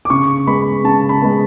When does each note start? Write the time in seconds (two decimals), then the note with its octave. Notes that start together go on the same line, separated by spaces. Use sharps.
0.05 D6
0.10 C#3 C#6
0.47 G#3 B3 B5
0.84 C#3 A5
1.09 B5
1.22 G#3 B3